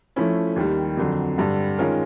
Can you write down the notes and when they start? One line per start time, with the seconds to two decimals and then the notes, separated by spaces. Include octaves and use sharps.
0.16 F3 A3 C#4 E4
0.56 D#2 D#3 G3
0.97 F2 D3 F#3
1.38 G2 D3 G3
1.79 D#3 G#3 C#4 F4 A#4